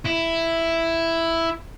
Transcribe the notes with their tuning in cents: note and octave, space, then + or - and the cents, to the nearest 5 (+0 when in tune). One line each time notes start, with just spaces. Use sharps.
E4 +5